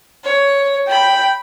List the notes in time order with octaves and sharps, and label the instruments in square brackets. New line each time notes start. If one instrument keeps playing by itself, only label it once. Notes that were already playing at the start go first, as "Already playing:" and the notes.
[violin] C#5
[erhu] G5 [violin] B5